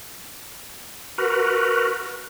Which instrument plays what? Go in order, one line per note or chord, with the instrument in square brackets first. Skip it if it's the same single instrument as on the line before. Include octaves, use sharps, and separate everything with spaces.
[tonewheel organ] F#4 A#4 B4